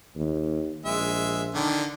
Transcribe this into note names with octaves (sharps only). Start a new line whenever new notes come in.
D#2
A#1 G#3 E5
D3 D#3